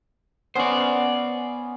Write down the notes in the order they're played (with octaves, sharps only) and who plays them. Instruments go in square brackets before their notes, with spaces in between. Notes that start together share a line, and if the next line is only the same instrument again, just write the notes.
[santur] B3 C#4 [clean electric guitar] C5 D5